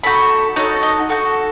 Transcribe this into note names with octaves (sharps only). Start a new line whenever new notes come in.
D#4 F#4 A4 B5
D#4 F#4 A4 C#5
D#5
D#4 F#4 A4